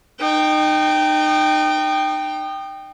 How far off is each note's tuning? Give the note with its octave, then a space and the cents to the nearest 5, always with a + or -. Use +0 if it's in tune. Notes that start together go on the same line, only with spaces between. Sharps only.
D#4 -30 G5 +0